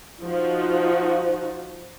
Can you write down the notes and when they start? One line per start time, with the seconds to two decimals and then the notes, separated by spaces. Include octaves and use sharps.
0.24 F3 D#4 F#4